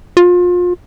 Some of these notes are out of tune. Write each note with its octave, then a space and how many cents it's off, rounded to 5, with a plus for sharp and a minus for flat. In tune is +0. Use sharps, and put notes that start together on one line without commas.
F4 +30